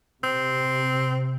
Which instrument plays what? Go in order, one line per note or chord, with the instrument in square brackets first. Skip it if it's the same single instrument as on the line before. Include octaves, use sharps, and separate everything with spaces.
[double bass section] C3 [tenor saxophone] C4